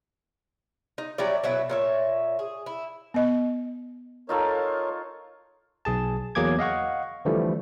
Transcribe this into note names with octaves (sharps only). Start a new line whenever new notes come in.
D#4
F#3 G3 E4 D5
B2 F#3 E4
A#2 C#5 E5
G#4
E4
B3 D#5
D#4 F4 A4 A#4 C#5
B1 G#4 A5
E2 F#3 A#3 G#4 D6 G#6
D#5 F5 F#5 C#6
D3 E3 F3 G3 A3